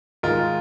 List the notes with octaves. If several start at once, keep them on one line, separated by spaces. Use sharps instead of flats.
G#2 D#3 G#3 F4 A#4